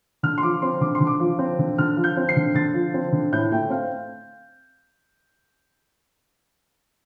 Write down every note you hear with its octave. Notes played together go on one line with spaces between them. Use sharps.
D3 F6
C6
F3 D6
C4 C6
D3 D6
C6
D3
D6
F3
C4
D3
D3 F6
F3
G6
C4
C7
D3
D3 A6
F3
C4
D3
A2 G6
A3 G5
C4 F5